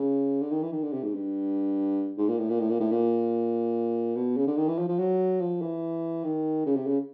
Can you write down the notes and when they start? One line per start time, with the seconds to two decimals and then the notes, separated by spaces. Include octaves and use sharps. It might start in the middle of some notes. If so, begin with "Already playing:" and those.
Already playing: C#3
0.41 D3
0.51 D#3
0.63 E3
0.72 D#3
0.83 D3
0.93 C3
1.03 G#2
1.15 G2
2.18 G#2
2.28 A#2
2.39 A2
2.50 A#2
2.60 A2
2.70 A#2
2.80 A2
2.92 A#2
4.16 B2
4.37 C#3
4.47 D3
4.57 D#3
4.68 E3
4.79 F3
4.89 F3
4.99 F#3
5.41 F3
5.62 E3
6.24 D#3
6.66 C#3
6.76 C3
6.87 C#3